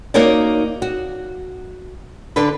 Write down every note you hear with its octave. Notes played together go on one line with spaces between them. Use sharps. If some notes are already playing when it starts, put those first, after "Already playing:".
A#3 D#4 F#4 A#4 C#5 D5
F#4
D3 D4 A4 B4